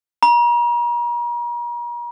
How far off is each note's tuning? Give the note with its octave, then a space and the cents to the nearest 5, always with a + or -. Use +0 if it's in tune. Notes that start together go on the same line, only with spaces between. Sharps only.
A#5 +40